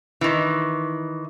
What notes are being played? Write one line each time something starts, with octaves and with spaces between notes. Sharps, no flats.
D#3 E3